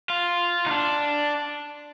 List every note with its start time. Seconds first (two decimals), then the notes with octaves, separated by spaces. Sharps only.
0.10 F4
0.66 D#4
0.71 D4